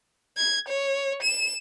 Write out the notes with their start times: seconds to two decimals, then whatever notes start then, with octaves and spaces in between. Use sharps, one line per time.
0.37 G#6
0.69 C#5
1.23 E7